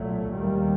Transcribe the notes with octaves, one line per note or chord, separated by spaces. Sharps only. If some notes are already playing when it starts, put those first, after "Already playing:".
Already playing: B1 A#2 F#3 A3
D#2 D#3 G3